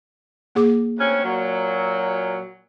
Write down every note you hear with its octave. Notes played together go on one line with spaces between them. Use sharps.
A#3 G#4 D6
D2 C4 C#4
A#2 F#3